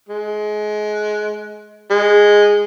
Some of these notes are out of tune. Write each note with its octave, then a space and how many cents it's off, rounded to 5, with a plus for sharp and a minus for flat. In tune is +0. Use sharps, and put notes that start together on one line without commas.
G#3 +25
G#3 -5